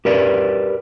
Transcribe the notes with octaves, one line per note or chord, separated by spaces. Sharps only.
G4 A#4 B4 D5